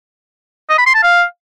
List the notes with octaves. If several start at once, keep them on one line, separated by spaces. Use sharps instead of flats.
D#5
B5
C6
A5
F5